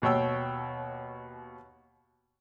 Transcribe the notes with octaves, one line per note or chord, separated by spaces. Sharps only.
D#2 B2 C#5 G5 E6